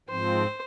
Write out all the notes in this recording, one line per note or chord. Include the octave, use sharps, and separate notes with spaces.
G#2 F3 C4 C5